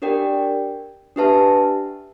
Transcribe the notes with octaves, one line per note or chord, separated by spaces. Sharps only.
D4 G4 A#4 D5 G5
D4 G4 B4 E5 A5